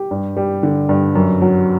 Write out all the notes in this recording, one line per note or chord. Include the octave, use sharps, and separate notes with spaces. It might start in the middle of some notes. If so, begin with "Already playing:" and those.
Already playing: G4
G2
G3
D3
G2
F#2
F#3